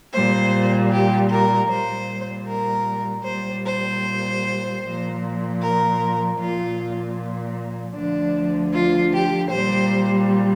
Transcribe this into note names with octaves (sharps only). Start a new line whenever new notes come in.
A#2 G3 C5
G4
A#4
A#2 G3 C5
A#4
A#2 G3 C5
C5
A#2 F3
A#4
A#2 F3 F4
D2 D3 F3 D4
F4
G4
A#2 G3 C5